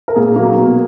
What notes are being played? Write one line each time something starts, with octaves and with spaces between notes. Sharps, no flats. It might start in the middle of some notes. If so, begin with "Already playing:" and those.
A#4
A#2 G#4
F#3 A#3
B2